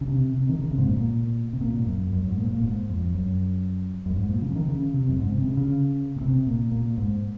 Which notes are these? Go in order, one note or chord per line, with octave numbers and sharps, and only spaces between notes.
C#3
C3
C3
D#3
C#3
C3
G#2
A#2
A#2
C3
A#2
G#2
F#2
F#2
G#2
A#2
A#2
G#2
F2
F#2
F#2
G#2
A#2
C#3
F3
D#3
C#3
C3
F#2
G#2
C3
C#3
C#3
A#2
C3
A#2
A#2
G#2